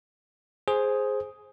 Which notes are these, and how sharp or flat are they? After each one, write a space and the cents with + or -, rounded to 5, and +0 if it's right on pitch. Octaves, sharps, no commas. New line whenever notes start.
G#4 +5 C5 +5